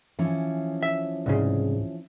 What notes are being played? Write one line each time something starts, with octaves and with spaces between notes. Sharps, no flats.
E3 F3 C#4
E5
C2 G#2 C#3